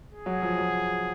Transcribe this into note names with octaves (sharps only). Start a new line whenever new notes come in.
G#4
F#3
F3
F#3